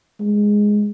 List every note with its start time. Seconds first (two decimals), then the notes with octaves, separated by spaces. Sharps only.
0.20 G#3